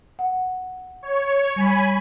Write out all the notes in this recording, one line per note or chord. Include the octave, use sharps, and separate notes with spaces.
F#5
C#5
G3 G#5 B5